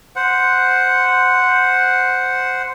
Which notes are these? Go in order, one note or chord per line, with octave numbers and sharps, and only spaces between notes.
C5 F#5